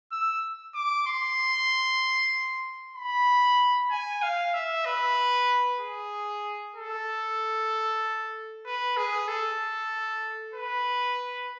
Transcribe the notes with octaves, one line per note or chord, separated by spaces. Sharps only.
E6
D6
C6
B5
G#5
F5
E5
B4
G#4
A4
B4
G#4
A4
B4